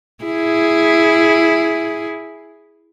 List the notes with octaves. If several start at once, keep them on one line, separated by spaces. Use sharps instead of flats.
E4 G#4